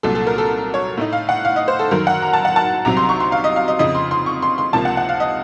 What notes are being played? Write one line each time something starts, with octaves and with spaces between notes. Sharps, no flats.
C2 A#2 F#3 A4
A4
A#4
A4
C#5
A2 A3 D#4
F5
F#5
F5
D#5
C5
A4
F#2 D#3 F#3 A#4
F#5
A#5
A5
F#5
A5
C2 C3 F#3 A#5
C6
C#6
C6
F5
D#5
F5
D#5
F2 C#3 F3 D#5
C6
C6
C#6
C6
C6
C#2 C3 F3 A#3 A5
F#5
F#5
F5
D#5